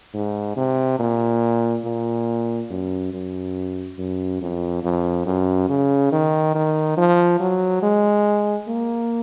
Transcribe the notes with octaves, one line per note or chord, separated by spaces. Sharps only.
G#2
C3
A#2
A#2
F#2
F#2
F#2
F2
F2
F#2
C#3
D#3
D#3
F3
F#3
G#3
A#3